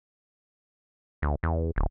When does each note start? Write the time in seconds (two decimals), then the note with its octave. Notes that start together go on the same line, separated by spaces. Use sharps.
1.22 D2
1.43 E2
1.76 D1